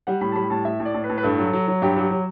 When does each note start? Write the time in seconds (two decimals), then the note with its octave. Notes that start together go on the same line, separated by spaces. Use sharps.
0.07 G3 F#5
0.21 A2 B5
0.32 A5
0.36 G3 B5
0.50 A2 A5
0.65 A2 E5
0.80 A2
0.85 D5
0.94 A2
1.04 B4
1.09 A2
1.18 B4
1.23 G2 A4
1.38 F#3
1.53 F#3
1.68 F#3
1.82 G2 G4
1.96 F#3 G4
2.11 F#3